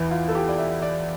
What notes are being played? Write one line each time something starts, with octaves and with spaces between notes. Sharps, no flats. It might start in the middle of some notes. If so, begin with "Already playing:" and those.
Already playing: E2 E3 E4
F4
A4
G4
D5
E5
D5